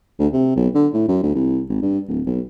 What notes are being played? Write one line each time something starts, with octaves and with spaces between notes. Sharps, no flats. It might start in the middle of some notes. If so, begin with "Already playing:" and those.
D2
C3
B1
D3
A2
F#2
D2
C2
G#1
G2
D1
B1